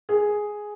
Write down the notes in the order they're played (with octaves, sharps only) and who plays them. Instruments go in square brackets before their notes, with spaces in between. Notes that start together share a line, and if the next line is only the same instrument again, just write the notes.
[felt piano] G#4